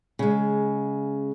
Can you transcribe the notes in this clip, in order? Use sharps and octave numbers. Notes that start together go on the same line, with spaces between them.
C#3 G#3